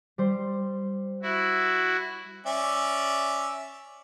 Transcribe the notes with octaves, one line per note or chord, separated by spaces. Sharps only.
G3 C5
E4 F#4
C#4 D5 E5